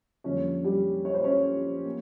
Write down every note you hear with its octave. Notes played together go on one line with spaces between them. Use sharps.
F2 D3 G3 A#3 C#4 C#5
G3 G4
C#5
C5
C#4 C#5
A#3